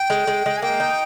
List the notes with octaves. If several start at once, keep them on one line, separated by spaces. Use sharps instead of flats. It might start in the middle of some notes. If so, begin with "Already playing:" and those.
Already playing: G5
G#3
G#3
G#3
G#5
A#3 G5
D#4